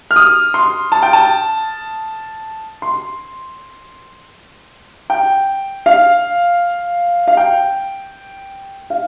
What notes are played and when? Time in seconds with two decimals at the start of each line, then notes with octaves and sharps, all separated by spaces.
0.11 F6
0.16 D#6
0.54 C6
0.92 A5
1.02 G5
1.13 A5
2.82 C6
5.10 G5
5.86 F5
7.27 F5
7.37 G5
8.90 F5